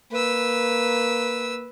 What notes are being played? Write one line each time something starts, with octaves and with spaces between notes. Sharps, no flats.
A#3 B4 E6